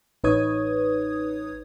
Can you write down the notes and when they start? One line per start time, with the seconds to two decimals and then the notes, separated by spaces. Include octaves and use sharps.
0.24 A1 D#4 B4 C#5 D#6 G#6